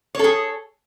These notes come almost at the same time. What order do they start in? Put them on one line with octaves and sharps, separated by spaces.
C#5 A4 G#4